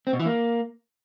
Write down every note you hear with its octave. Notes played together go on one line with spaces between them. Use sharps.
C4
B2
E3
A#3